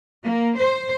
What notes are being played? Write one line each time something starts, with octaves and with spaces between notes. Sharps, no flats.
A#3
C5